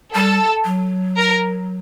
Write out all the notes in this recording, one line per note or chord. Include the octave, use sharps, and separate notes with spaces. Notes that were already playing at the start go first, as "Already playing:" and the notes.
G3 A4
F#3
A#4